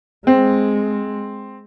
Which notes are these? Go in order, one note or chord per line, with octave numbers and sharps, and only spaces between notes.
G#3 C4